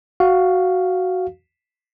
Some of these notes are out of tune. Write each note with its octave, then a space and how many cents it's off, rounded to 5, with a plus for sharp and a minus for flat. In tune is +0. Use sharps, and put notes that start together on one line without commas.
F#4 +0 F5 +0